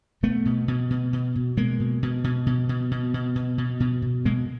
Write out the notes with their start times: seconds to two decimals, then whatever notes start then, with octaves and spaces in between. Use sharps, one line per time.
0.23 B2 A3 B3
0.45 B2
0.68 B2
0.90 B2
1.13 B2
1.36 B2
1.57 B2 G#3 A#3
1.80 B2
2.03 B2
2.24 B2
2.46 B2
2.69 B2
2.91 B2
3.14 B2
3.35 B2
3.58 B2
3.80 B2
4.02 B2
4.25 B2 G#3 A#3